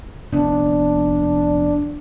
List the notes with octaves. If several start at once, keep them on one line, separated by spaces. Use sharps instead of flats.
F1 B3 D4